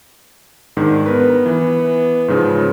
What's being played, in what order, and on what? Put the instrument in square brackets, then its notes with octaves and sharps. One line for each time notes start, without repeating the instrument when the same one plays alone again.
[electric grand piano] G#2 D#3 D4
[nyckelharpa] B3 [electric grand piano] A#4 B4
[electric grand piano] E3
G#2 C#3 F3